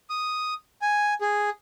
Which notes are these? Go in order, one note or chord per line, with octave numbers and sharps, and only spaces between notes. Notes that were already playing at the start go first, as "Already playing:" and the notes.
D#6
G#5
G#4